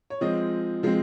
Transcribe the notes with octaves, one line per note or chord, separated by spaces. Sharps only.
C#5
F3 G#3 C4 D#5
F3 G#3 C4